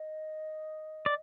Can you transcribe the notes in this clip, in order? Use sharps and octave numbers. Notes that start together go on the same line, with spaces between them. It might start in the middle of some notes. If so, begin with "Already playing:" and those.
Already playing: D#5
D5